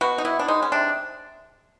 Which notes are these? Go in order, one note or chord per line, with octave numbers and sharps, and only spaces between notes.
B2 F#4
D#4
B3 E4
D4
G#3 D#4
C#4
C3 D4